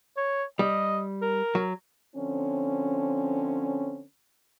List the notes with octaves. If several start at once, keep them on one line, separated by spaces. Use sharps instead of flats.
C#5
G3 D#5
A#4
F#3
D3 F3 C4 C#4